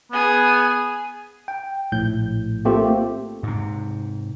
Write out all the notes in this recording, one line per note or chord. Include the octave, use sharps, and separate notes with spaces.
B3 G#4
G5
A#1 A2 G6
A3 A#3 C4 F4 G4
G#2 C3